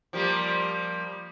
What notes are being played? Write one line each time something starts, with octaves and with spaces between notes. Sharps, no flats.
F3 G3 A#3